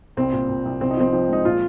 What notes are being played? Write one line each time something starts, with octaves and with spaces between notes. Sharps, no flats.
C2 C4
A#2
A#2
C2
C2 C4
D#4
F3 C4
F3
G#3 D#4
A#2 F4